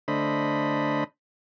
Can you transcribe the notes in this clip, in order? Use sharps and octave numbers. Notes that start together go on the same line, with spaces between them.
D3 A3 D4 C5 D#5 B5